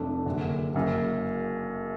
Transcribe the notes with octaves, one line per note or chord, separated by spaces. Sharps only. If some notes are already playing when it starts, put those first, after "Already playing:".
Already playing: F1 F2 F3 A3 D4
F#1 F#2 D3
F#1 F#2 C#3